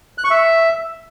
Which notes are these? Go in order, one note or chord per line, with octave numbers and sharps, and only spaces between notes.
F#6
C#6
E5